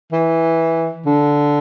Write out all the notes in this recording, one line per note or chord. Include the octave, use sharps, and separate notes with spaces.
E3
D3